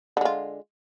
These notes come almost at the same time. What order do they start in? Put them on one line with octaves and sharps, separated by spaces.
D3 G#3 F4